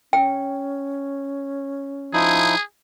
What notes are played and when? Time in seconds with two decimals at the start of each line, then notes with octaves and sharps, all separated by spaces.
0.13 C#4 G5
2.13 F3 D#4 E4 G#4